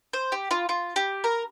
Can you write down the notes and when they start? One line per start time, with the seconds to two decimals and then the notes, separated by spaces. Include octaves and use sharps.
0.13 C5
0.32 G4
0.51 F4
0.69 F4
0.96 G4
1.24 A#4